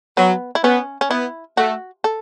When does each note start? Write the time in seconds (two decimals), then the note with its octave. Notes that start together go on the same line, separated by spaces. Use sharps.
0.17 F#3 B3
0.55 E4
0.64 B3 C#4
1.01 C#4
1.10 B3 E4
1.57 A3 F#4
2.04 A4